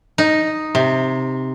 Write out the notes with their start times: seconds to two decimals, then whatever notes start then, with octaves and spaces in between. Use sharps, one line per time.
0.18 D#4
0.75 C3